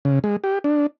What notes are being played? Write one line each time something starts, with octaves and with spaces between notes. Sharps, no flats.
C#3
G#3
G4
D4